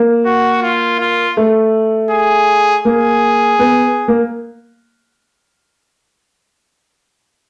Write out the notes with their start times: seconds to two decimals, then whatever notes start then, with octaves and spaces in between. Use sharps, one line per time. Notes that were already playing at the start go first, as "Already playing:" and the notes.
Already playing: A#3
0.26 F#4
0.63 F4
1.00 F4
1.37 A3
2.11 G#4
2.85 A#3 G#4
3.59 B3
4.08 A#3